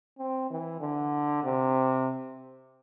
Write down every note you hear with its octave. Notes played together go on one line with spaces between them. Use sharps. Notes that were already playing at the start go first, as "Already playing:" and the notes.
C4
E3
D3
C3